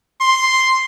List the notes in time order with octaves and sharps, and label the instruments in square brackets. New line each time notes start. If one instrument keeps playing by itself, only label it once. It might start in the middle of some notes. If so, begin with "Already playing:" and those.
[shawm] C6